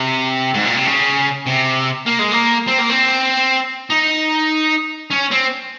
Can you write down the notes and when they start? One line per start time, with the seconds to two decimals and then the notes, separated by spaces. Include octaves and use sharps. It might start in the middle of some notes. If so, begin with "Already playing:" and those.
Already playing: C3
0.54 G#2
0.65 A#2
0.75 C3
0.86 C#3
1.47 C3
2.06 A#3
2.19 G#3
2.32 A#3
2.68 C4
2.79 A#3
2.90 C4
3.90 D#4
5.11 C#4
5.32 C4